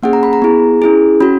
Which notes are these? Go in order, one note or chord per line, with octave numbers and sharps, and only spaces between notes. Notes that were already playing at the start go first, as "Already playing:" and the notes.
A#3 C#4 G#4 F#5
A#5
B5
A#5
B3 E4 G#4
C#4 E4 G#4
C#4 F#4 B5